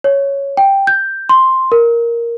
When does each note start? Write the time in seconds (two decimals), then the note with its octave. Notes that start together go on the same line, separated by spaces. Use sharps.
0.04 C#5
0.57 G5
0.87 G6
1.29 C6
1.72 A#4